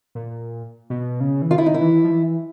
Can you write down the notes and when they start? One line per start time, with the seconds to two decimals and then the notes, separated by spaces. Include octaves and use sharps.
0.15 A#2
0.90 B2
1.20 C#3
1.42 E3
1.51 D#3 F4
1.58 E4
1.66 D#4
1.74 E4
1.81 E3
2.04 F3
2.11 E3